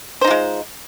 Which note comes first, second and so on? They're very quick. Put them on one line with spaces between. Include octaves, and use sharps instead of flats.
C5 D#4 F4 G#3